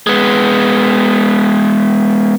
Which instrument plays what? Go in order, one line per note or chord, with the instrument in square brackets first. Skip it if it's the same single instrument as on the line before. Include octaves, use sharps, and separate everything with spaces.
[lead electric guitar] G#3 B3